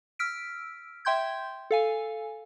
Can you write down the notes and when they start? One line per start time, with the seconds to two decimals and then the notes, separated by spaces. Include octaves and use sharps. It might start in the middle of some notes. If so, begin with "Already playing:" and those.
0.19 E6 F6 B6 D7
1.05 E5 G5 C6 G6 G#6
1.71 A4 F5 G#5